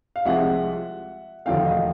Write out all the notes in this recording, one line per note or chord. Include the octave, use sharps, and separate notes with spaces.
F5
C2 C3 F3 G#3 C4 E5 F#5
E1 D#2 D3 F3 A3 F5 G5
D#5 F5